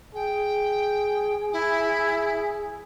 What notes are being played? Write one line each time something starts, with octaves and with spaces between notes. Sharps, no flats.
G#4 G5
E4